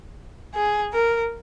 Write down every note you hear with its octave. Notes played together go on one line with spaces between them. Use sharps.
G#4
A#4